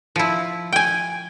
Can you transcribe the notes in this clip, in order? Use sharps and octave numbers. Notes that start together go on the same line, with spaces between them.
F3 E4
G5 G#5